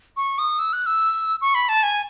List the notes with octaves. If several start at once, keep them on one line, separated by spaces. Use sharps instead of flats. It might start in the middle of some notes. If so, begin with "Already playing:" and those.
C#6
D#6
E6
F#6
E6
C#6
B5
A5
G#5